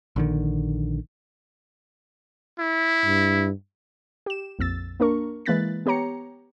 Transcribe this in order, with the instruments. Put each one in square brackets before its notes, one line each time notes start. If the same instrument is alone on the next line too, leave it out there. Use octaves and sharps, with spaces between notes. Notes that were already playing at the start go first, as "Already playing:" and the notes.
[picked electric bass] A#1 D3 D#3
[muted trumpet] E4
[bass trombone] G2
[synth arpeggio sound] G4 E7
A#1 F2 E6 A6
A#3 D4 A#4 C#6
E3 G#3 A#3 F#6 A6 B6
B3 G4 C#5 A#5 C#7